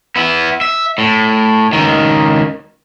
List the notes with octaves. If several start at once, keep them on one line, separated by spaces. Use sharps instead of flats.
B3 E4
E5
A2
C#2 D#3